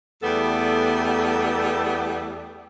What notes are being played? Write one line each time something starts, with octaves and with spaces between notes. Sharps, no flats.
E2 G3 A3 B3 A4 D5